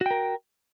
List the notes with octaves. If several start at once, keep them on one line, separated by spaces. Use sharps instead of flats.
F#4 A#4 G5